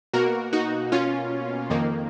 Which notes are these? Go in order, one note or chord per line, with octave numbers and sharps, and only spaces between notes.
B2 A#3 F#4 A#4
D#4 F#4
C#4 F4
F2 D#3 A#3